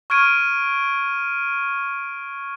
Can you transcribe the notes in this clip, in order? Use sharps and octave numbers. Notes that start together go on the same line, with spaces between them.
C#6 F6 G#6 D7 D#7